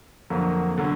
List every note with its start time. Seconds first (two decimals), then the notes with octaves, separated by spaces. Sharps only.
0.30 F2 D3 F#3 A#3
0.78 D3 F#3